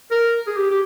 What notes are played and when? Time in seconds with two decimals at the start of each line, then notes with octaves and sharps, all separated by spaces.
0.11 A#4
0.47 G#4
0.57 G4
0.71 G4